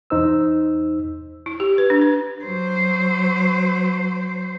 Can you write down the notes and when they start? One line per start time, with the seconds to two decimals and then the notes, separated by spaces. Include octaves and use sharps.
0.10 E2 D#4 C5 E6
1.46 E4
1.60 G4
1.78 B4
1.90 D4
2.01 B4
2.44 F#3 C5